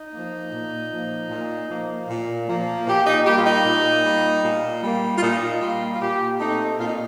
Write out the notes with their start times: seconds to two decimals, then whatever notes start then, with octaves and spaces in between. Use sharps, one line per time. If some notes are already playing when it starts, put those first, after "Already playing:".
Already playing: D#4
0.13 F3 A#3
0.52 A#2
0.92 F3 A#3
1.30 A#2
1.70 F3 A#3
2.09 A#2
2.48 F3 A#3
2.86 A#2 G4
3.07 D#4
3.25 G3 A#3 G4
3.37 F4
3.45 D#4
3.65 A#2
4.04 G3 A#3
4.43 A#2
4.83 G3 A#3
5.18 F4
5.21 A#2 D#4
5.60 G3 A#3 F4
5.94 F4
6.00 A#2 G4
6.39 A3 C4 D#4
6.78 A#2 F4
6.86 D#4